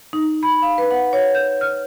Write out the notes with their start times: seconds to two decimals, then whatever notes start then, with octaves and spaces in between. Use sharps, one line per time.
0.13 D#4
0.43 B5
0.62 F5
0.78 B4
0.91 F#5
1.13 C#5
1.35 G6
1.61 F6